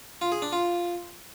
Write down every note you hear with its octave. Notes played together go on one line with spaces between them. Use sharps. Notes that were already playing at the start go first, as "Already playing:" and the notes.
F4
G#4
D4
F4